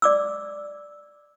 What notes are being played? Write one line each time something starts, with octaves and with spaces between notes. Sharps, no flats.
D5 D6 E6